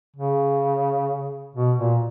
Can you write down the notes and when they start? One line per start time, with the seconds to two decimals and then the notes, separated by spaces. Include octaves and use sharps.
0.16 C#3
1.56 B2
1.79 A#2